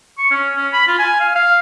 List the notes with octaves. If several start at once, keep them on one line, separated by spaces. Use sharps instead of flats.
C#6
C#4
C#4
B5
F4
G#5
F5
F5